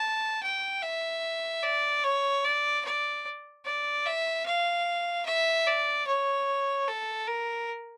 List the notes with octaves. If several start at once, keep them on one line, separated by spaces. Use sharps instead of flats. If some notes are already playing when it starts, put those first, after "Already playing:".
Already playing: A5
G5
E5
D5
C#5
D5
D5
D5
E5
F5
E5
D5
C#5
A4
A#4